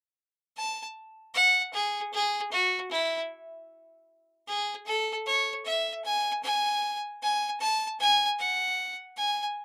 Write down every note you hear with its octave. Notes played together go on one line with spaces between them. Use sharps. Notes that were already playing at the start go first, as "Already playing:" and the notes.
A5
F#5
G#4
G#4
F#4
E4
G#4
A4
C#5
E5
G#5
G#5
G#5
A5
G#5
F#5
G#5